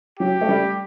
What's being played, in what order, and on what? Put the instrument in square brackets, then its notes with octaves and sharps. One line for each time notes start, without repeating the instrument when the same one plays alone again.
[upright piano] F#3 [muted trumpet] G4
[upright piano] A3
G3